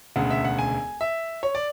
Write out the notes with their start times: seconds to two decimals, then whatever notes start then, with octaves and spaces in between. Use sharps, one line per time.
0.16 E1 D2 C#3 F#5
0.31 E5
0.45 F#5
0.59 G#5
1.01 E5
1.43 C#5
1.55 D5